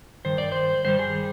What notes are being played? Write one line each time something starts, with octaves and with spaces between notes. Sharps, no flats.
G2 D#3 C5
D5
C5
G2 D#3 G3 C5
G#4